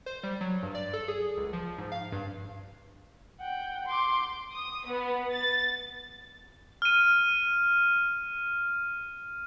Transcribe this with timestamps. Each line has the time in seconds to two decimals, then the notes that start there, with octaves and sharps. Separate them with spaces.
0.06 C5
0.23 G3
0.41 F#3
0.63 G2
0.75 D5
0.93 A4
1.08 G#4
1.37 C#2
1.53 F3
1.78 G#2
1.92 F5
2.12 G2
3.40 F#5 G5
3.86 C6 D6
4.53 D#6
4.88 B3
5.31 A6
6.82 F6 D#7